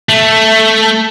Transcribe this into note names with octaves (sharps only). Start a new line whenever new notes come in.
A3